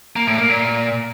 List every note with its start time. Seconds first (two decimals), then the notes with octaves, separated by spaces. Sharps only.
0.16 A#3
0.27 A2
0.38 A#3
0.49 A#2